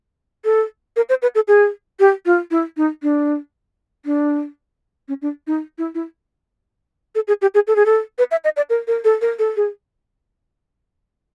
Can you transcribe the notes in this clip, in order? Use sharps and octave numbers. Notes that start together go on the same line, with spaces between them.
A4
A#4
C5
B4
A4
G#4
G4
F4
E4
D#4
D4
D4
C#4
D4
D#4
E4
E4
A4
G#4
G4
G#4
A4
G#4
A4
B4
E5
D#5
D5
A#4
A#4
A4
A#4
A4
G#4